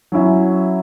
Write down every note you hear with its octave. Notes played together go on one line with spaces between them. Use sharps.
F#3 C#4 E4